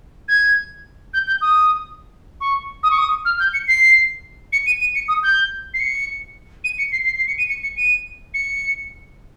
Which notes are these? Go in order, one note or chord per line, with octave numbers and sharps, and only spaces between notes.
G#6
G6
G6
D#6
C#6
D#6
C#6
D#6
F6
G6
C#7
C7
C#7
D#7
D#7
C#7
D#6
G6
C7
C#7
D#7
C#7
C7
C7
C7
C#7
D#7
C#7
C#7
D#7
C#7